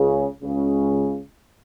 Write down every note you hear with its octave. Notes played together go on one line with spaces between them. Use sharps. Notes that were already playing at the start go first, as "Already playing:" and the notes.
Already playing: C#2 C#3
C#2 C#3